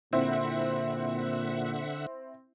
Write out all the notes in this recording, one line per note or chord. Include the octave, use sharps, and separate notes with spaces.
A#2 D3 C4 E4 E5 F#5